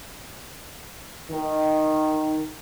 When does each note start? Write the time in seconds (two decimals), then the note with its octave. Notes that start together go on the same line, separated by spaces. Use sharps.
1.30 D#3